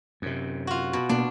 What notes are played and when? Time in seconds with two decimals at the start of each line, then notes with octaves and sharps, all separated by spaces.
0.22 F#2 C3
0.67 F4 F#4
0.93 B2
1.09 B2 A#3 D4